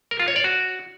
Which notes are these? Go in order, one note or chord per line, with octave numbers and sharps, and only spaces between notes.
A#4
F4
C#5
D5
F#4